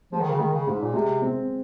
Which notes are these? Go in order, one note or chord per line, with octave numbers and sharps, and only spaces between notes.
F3 G#3
D#3
C#3
D#3 G#3
C#3
G#2 G#3
A#2
C3 G#3
C4